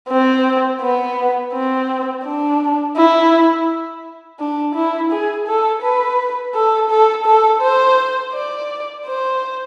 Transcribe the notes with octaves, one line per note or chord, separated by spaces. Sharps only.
C4
B3
C4
D4
E4
D4
E4
G#4
A4
B4
A4
A4
A4
C5
D5
C5